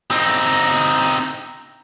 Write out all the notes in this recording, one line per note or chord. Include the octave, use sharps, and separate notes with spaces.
C4 D#4